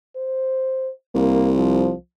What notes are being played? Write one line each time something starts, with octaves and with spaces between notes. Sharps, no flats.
C5
C2 A#3
F3